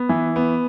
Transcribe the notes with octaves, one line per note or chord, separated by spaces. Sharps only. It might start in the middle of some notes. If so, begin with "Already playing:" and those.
Already playing: B3
E3
B3